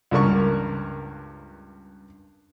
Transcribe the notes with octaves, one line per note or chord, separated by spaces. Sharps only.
C#2 G2 A#4 C#6